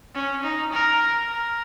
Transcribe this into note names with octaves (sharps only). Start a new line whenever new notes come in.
C#4
D#4
A#4
A#4